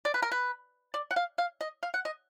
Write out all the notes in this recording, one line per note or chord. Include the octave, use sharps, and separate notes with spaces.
D5
B4
A#4
B4
D5
F#5
F5
F5
D#5
F5
F#5
D#5